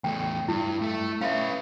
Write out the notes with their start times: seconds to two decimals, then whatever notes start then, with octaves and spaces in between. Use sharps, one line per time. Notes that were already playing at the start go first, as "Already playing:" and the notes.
0.04 E2 A3 G5
0.48 G2 E4
0.82 A3
1.21 C#4 B4 E5 F5